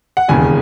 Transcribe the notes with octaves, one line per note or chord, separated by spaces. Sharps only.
F#5
E1 D#2 C#3 E3 G#5